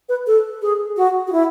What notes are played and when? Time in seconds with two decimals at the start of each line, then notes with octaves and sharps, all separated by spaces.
0.09 B4
0.27 A4
0.62 G#4
0.97 F#4
1.27 F#4
1.32 E4